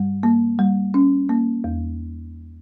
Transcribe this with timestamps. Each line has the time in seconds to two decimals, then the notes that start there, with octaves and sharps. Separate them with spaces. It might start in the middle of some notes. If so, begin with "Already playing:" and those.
Already playing: G2 G3
0.23 A#3
0.59 G3
0.94 C#4
1.29 A#3
1.64 E2